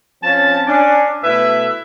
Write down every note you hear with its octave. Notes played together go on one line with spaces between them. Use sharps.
F3 C4 C#4 A5
C#4 D4
B2 A3 E4 B4 E5